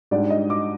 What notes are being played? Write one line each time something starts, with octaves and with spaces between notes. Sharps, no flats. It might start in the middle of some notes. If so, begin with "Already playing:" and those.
G#2 G3 D4 D5
D#5
D6